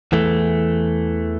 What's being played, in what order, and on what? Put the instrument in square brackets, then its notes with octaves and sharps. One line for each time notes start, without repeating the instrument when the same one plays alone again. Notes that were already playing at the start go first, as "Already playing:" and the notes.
[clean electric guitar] E2 E3 A3